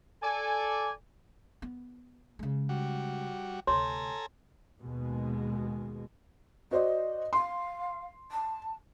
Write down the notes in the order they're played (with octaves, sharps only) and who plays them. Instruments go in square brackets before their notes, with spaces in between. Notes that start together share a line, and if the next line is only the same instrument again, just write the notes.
[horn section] A4 D5 G#5
[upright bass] B3
C#3 G#3
[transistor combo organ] G3 F#4
[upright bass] D2 C3 [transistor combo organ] A4 G#5 A#5 [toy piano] C#5 C6
[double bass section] D#2 B2 G#3
[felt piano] F#4 C5 D5 [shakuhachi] D#5
[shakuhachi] F5 [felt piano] C6
[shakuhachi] A5